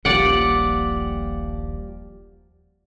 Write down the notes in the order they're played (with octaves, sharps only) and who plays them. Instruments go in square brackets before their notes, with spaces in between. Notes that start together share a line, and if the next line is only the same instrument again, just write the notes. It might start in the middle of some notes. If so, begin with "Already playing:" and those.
[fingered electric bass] D#1 A#1 G3 [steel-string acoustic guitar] F3 A#3 G4 [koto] D5 F#5